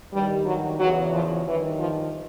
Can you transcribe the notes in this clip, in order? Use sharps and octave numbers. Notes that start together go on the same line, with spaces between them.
G2 D#3 G3
F#3
E2 C#3 E3 F#3
F3
G2 D#3 E3
F3